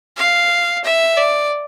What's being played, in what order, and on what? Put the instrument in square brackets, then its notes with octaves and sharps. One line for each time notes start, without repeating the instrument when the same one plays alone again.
[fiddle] F5
E5
D5